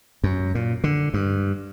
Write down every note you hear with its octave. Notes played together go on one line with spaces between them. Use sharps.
F#2
A#2
D3
G2